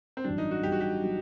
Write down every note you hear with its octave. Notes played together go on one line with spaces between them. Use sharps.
C4
A1 G2 F#3 D4
D#4
F#4
A1 G2 F#3 G4
F#4
G4
F#3